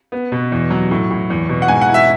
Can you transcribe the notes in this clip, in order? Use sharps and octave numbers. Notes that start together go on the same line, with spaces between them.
B3
B2
E2
F#3
A2
A2
E2
B2
F#5
G#2 G#5
F#5
E4
E5